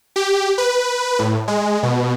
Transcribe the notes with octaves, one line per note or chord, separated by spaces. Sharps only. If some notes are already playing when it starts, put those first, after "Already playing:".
G4
B4
A2
G#3
B2